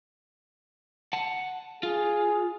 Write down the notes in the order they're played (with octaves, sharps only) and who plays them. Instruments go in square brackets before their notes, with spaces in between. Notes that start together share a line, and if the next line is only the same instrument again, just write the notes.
[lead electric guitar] F#5 A5
[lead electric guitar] F4 [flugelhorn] G#4